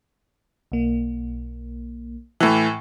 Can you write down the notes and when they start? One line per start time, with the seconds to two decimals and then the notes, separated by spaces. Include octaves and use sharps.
0.72 B1 A#3
2.40 A2 E3